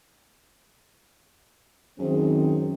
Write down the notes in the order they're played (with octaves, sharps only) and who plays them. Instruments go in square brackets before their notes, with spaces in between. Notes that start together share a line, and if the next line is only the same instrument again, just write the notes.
[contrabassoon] F#2 [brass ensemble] D#3 C4 [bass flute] G#4